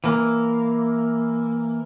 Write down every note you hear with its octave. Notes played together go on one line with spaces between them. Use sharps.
E3 A#3